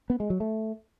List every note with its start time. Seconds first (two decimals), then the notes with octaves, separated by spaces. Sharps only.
0.10 B3
0.20 G#3
0.30 F#3
0.40 A3